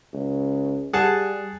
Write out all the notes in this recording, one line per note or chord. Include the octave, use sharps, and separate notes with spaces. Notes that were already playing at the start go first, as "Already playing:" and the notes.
C#2
G3 G#4 F#5 A5